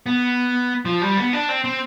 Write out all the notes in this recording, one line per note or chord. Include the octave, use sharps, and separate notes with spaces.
B3
F3
G3
B3
D4
C4
C4